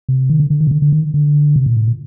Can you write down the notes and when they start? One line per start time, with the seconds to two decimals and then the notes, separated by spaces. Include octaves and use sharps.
0.09 C3
0.29 D#3
0.40 D3
0.50 D3
0.60 D#3
0.67 C3
0.71 D3
0.82 D3
0.92 D#3
1.14 D3
1.56 C3
1.66 A#2
1.77 A2
1.87 A#2